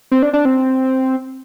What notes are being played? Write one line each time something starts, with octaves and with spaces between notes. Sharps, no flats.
C4
D4
D4
C4